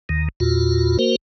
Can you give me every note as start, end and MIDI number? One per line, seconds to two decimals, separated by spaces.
0.09 0.28 39
0.09 0.28 51
0.40 0.98 40
0.40 0.98 46
0.40 0.98 65
0.40 0.98 66
0.99 1.16 58
0.99 1.16 66
0.99 1.16 70
0.99 1.16 72